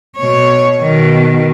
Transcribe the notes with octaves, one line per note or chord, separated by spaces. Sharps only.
B2 C#5
B2 D#3